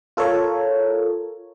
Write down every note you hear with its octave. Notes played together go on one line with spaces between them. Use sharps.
F4 A4 A#4 C#5